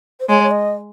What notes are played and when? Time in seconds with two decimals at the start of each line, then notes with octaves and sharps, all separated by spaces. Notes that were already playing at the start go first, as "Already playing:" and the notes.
0.20 C5
0.29 G#3 C#5
0.43 C#5
0.51 D#5